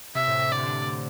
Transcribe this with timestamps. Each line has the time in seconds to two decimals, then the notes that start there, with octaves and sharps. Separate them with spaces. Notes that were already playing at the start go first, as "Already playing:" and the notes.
0.15 C3 E5
0.28 A2
0.39 C3
0.52 D3 D5
0.58 C3
0.66 D3